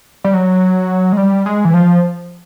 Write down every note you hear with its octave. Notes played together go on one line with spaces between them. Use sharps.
G3
F#3
G#3
G3
G#3
E3
F3